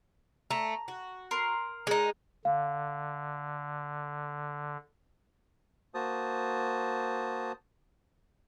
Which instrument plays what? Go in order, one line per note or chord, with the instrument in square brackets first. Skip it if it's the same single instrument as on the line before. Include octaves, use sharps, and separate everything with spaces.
[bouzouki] A3 [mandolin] A#5
[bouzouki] F#4
[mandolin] A#4 C6
[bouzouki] G#3 D#4
[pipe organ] D3 [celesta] F5
[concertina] A#3 F#4 C5 A5 D#6